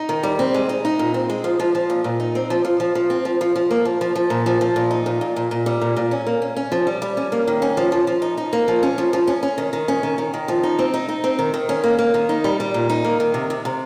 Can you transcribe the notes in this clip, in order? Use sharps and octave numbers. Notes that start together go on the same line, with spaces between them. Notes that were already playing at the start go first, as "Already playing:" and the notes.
Already playing: D#4
D#3
G3
C4
G#3
D#4
D#4
A#2
C4
G#3
F3
F3
F3
A#2
A#2
D#4
C4
F3
F3
F3
F3
C4
F3
F3
F3
A#3
F3
F3
F3
A#2
F3
F3
A#2
D#4
A#2
A#2
A#2
A#2
G3
A#2
A#2
C#4
A#3
C#4
C#4
F3
G3
G3
C#4
A#3
D#3
C#4
F3
F3
F3
D#4
D#4
A#3
F3
C#4
F3
F3
C#4
C#4
D#3
D#3
C#4
D#3
D#3
D#3
F3
D#4
C4
D#4
D#4
C4
D#3
D#3
C#4
A#3
A#3
D#3
D#4
G3
G3
A#2
D#4
A#3
D#3
C3
C3
C3